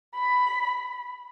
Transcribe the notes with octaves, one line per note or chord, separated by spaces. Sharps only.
B5